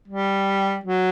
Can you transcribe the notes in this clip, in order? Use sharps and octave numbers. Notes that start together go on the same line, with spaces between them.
G3
F#3